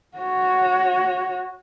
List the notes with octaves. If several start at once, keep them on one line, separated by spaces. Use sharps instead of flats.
F#4 C#5